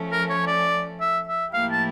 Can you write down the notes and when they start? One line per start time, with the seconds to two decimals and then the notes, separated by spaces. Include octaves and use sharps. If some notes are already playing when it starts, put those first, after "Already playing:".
Already playing: F3 A3 C#4
0.12 A#4
0.30 C#5
0.47 D5
1.00 E5
1.27 E5
1.53 A2 F3 A#3 E4 G4 F5
1.71 A5